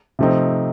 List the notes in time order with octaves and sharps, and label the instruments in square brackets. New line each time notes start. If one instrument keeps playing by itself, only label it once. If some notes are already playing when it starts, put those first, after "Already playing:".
[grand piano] C3 F3 A3 C4 D#4